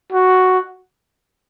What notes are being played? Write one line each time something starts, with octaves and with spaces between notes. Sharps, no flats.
F#4